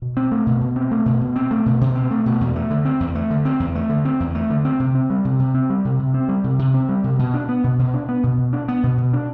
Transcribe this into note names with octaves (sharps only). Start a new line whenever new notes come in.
B2
C4
A3
B2
B2
C4
A3
B2
B2
C4
A3
B2
B2
C4
A3
B2
E2
A3
D3
C4
E2
A3
D3
C4
E2
A3
D3
C4
E2
A3
D3
C4
C3
C4
G3
C3
C3
C4
G3
C3
C3
C4
G3
C3
C3
C4
G3
C3
B2
D4
B3
B2
B2
D4
B3
B2
B2
D4
B3
B2
B2
D4